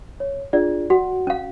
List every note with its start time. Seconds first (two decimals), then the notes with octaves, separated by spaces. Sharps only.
0.20 C#5
0.53 D4 F4 G#4 D5
0.90 F#4 F#5
1.27 C#4 F5